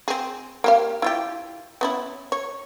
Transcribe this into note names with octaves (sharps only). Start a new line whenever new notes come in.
C4 G#4
A#3 G4 F5
E4 F4 G4
B3 C#4 E4
C#5